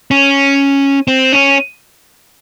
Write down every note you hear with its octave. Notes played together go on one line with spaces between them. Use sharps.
C#4
C4
C#4